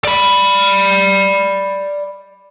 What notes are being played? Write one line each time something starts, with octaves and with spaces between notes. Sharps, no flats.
D5 B5